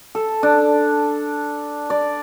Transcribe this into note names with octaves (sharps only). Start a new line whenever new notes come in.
A4
D4
D5